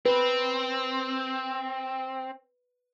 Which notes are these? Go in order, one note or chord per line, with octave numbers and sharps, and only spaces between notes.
C4 B4